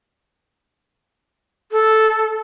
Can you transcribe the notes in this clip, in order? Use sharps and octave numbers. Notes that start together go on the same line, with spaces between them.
A4